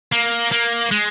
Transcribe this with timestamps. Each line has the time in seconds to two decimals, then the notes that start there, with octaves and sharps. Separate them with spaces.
0.13 A#3
0.52 A#3
0.91 G#3